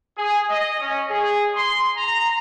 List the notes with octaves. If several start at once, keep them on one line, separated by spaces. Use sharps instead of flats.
G#4
D#5
C#4
G#4
C6
A#5